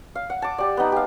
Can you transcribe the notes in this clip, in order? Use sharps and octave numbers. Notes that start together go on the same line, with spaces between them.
F5
F#5
A5 D6
G4 D5
B3 D#4
G4 F5